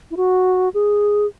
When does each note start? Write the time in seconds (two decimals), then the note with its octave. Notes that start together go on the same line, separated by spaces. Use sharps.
0.11 E4
0.17 F#4
0.74 G#4